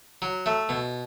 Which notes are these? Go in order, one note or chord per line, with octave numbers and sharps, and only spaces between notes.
F#3
A3
B2